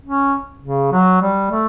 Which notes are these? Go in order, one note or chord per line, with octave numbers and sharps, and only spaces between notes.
C#4
C#3
F#3
G3
A3